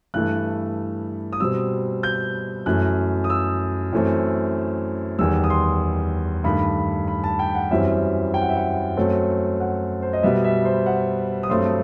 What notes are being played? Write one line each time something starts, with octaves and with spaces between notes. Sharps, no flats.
G2 E3 A3 F#6
D#6
B2 G3 C4 E6
G6
F#2 E3 A3 F#6
D#6
E6
F#2 E3 A3 C4
E2 D#3 G3 E6
D#6
C6
G2 D#3 A3 B5
B5
A5
G5
F#5
F#2 E3 G3 C4 E5
G5
F#5
E5
F#5
F#2 F#3 A3 C4
F#5
C5
D#5
B2 G3 B3 E5
E5
C5
F#5
D#6
G2 F#3 A3 C4 C6